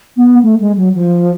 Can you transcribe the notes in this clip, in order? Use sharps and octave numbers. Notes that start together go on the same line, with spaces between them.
B3
A3
G#3
F#3
F3